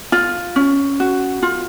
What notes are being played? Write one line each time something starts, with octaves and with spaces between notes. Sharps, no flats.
F4
C#4
F#4
F4